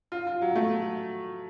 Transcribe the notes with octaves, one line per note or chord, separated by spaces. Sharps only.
F4
F4
F#3
A3